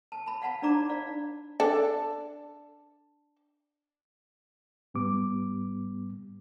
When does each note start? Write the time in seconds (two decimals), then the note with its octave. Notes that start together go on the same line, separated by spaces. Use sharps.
0.12 A5
0.26 A5 B5
0.42 F5 F#5 A5 B5
0.62 D4 D#4 D5 A#5 D6
0.89 D5 F5
1.60 D4 A4
4.94 G#2 G3 B3 D6